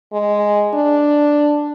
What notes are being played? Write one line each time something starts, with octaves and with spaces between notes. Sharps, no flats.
G#3
D4